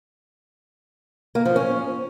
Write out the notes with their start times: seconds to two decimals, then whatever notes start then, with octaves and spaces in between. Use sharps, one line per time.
1.35 A#3
1.45 F3
1.56 C#4